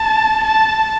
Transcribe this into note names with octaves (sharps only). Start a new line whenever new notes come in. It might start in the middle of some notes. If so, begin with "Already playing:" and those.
Already playing: A5
A5